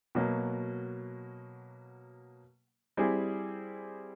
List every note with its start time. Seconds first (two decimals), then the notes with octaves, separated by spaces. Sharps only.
0.15 B2 F#3 A#3
2.97 G3 C4 E4 G#4